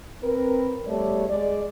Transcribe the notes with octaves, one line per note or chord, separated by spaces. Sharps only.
C4 A#4 B4
E2 G3 A3 G4 C#5 D5
G#3 D5